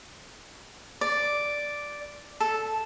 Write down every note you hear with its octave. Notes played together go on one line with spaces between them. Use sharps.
D5
A4